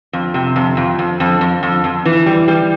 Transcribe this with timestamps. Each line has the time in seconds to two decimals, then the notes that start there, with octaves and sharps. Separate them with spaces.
0.13 F2
0.34 C3
0.56 F2
0.77 F2
0.99 F2
1.20 F2
1.41 F2
1.63 F2
1.84 F2
2.05 E3
2.26 G3
2.48 G3